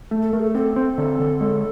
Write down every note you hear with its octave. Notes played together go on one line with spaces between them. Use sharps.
A3
A4
A3 A#4
G#4
A4
C4 A4
C4
D3
D3
G#3